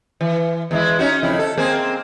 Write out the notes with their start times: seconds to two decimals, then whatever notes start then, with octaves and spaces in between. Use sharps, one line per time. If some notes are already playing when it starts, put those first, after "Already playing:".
0.21 E3
0.71 E2 G#3 E4
0.99 C#4 D#4 F#4
1.23 F2 C#3 E4
1.39 A4
1.57 A#3 C4 G#4